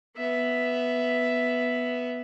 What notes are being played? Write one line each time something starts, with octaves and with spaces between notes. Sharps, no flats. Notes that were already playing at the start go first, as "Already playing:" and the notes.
B3 E5